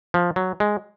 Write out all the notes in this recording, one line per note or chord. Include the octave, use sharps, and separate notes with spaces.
F3
F#3
G#3